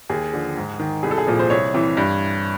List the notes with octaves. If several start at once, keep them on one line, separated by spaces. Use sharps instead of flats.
D#2 G#4
D3 F3
G#2
D#3
C2 G#4
A4
G#4
A#2 F3
C5
C2 C#5
C3 E3
G2